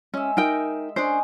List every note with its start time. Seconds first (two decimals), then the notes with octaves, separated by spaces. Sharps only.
0.14 G#3 C#4 E5
0.37 D#4 A#4 G5
0.96 C#4 D4 C5 D#5